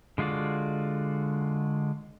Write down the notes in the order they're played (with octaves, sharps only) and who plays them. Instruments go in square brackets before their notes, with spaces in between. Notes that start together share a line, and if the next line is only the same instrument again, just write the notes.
[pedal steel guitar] D3 G#3 F4 F#4 D5